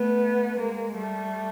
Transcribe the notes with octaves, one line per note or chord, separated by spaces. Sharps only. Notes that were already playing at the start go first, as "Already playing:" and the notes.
Already playing: A3 B3
G#3 A#3
G3 A3